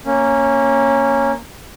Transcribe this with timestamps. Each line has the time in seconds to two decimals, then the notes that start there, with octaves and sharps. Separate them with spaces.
0.05 A#3 C#4